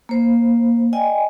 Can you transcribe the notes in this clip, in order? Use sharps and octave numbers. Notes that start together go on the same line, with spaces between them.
A#3 C5
D5 D#5 G5 G#5